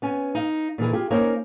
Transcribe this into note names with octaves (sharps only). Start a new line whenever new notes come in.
B3 C#4 G#5
D#4 F5
A#2 D#3 E3 G#4
F4 G4 G#4
A#3 C#4 D#4 A#4 C5 C#5